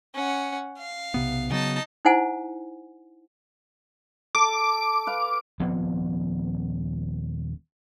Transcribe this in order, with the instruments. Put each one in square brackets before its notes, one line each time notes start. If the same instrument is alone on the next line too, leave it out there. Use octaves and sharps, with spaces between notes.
[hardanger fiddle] C#4 F#5
F5
[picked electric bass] B1 C3 B3
[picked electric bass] C#3 F#3 B3 [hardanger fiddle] D#4 A5
[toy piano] D#4 E4 C5 F#5 G#5
[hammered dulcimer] A4 [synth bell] D6
[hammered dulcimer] B4 F5
[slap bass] D#1 F3 B3 C4